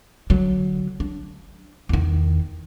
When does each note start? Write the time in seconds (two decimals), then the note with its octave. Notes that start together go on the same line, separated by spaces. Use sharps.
0.30 D3 F#3
1.00 D4
1.89 E2 D#3